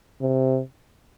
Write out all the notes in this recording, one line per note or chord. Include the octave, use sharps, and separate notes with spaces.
C3